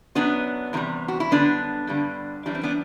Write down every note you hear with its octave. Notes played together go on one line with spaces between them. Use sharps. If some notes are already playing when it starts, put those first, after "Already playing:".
F#2 F#3 B3 D4
E2 C3 E3 G3
F#4
E4
F#2 D3 G3 B3 D4
G2 D3 G3
F#2 E3 G3 D4
C4
B3 D4